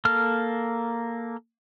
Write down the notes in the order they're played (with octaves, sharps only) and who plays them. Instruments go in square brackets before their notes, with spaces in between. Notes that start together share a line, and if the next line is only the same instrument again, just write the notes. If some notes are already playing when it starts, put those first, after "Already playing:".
[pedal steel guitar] A#3 A4 F6